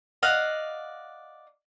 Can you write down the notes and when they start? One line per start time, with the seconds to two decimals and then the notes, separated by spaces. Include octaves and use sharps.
0.22 D5 D#5 F5 F#5